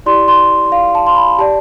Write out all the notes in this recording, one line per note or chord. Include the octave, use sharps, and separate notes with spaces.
E4 G4 D5 C6
C6
F5
A5
C6
B5
G4 D5 A5